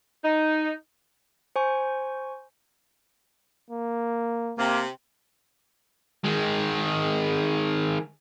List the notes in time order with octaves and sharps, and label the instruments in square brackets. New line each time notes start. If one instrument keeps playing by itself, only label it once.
[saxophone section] D#4
[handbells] C5 G#5 C#6
[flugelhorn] A#3
[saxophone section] C3 [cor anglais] A#3
[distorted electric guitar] D#3 G#3